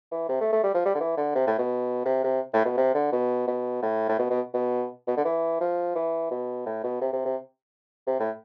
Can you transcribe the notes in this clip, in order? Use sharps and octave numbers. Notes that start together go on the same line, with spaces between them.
E3
C3
A3
A3
G3
F3
G3
D3
E3
D3
C3
A2
B2
C3
C3
A2
B2
C3
D3
B2
B2
A2
A2
B2
B2
B2
B2
D3
E3
F3
E3
B2
A2
B2
C3
C3
C3
C3
A2